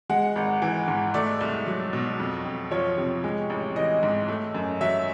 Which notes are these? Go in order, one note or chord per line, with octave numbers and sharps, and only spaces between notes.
G#3 F#5
G#1
E3
G#2
A3 D5
C2
F#3
B2
F2
F2
F3 C#5
C3
G#3
A1
E3 D#5
G#2
A3
F#2
F#3 E5